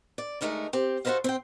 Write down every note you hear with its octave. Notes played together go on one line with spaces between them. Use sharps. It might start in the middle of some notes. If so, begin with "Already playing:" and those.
D5
D2 G#3 A3 D#4 A#4 D5
C4 G4
F#4 A4 B4 C5 D#5 F5
C4 C5 G5